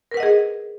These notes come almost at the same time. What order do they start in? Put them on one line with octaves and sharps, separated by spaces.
A#4 B4 F#5 D#5 G#4